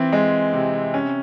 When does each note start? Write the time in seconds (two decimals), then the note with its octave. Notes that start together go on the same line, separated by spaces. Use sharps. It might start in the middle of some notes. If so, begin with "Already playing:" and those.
Already playing: E3 C4
0.13 G#3
0.53 C3
0.94 C#4